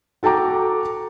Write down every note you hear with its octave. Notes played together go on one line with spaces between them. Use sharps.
F#4 A4 G5 A#5 D6